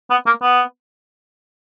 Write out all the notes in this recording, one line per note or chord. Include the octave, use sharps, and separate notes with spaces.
B3
A#3
B3